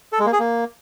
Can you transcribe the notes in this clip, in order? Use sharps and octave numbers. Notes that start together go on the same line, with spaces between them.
A4
G#3
A#3
G#4
A#3